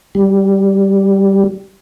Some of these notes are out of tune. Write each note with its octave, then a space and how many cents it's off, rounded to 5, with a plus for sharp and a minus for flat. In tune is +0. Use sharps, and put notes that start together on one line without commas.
G3 -5